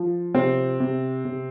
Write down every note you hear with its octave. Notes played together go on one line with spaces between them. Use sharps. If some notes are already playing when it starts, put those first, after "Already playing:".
Already playing: F3
C3 C4
C3
C3